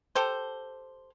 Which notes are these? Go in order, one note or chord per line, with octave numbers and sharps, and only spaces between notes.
G4 A4 C5